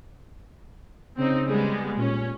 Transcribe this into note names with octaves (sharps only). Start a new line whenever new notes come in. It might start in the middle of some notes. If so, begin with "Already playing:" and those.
C#3 C4 D#4
G3 G#3 B3
A#2 C#4